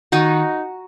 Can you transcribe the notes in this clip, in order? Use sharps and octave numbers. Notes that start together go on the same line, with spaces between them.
D#3 D#4 F#4